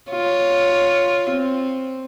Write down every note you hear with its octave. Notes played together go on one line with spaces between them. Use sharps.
F4 C#5
C4